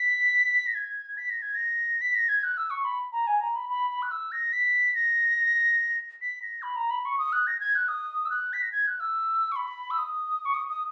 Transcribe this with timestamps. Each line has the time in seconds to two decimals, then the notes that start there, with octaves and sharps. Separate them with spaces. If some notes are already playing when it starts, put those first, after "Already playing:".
Already playing: B6
0.67 A#6
0.75 G#6
1.17 B6
1.30 A#6
1.42 G#6
1.55 A#6
2.01 B6
2.15 A#6
2.29 G#6
2.43 F#6
2.57 E6
2.70 C#6
2.85 B5
3.12 A#5
3.27 G#5
3.40 A#5
3.55 B5
3.69 B5
3.90 B5
4.02 F#6
4.11 E6
4.32 A#6
4.53 B6
4.94 A#6
6.21 B6
6.42 A#6
6.62 B5
6.76 A#5
6.90 B5
7.05 C#6
7.18 D#6
7.32 F#6
7.47 A#6
7.60 G#6
7.75 F#6
7.88 D#6
8.25 E6
8.30 F#6
8.53 B6
8.62 A#6
8.72 G#6
8.87 F#6
9.00 E6
9.52 C#6
9.56 B5
9.91 E6
9.98 D#6
10.45 C#6
10.54 D#6
10.68 D#6